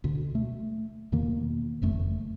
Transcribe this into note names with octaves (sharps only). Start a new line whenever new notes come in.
D2 B2
A3
E2 B2 D#3 A#3
F#1 F2 A3